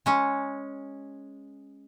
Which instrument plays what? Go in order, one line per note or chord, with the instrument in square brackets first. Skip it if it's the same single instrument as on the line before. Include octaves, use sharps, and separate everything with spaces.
[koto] G#3 C#4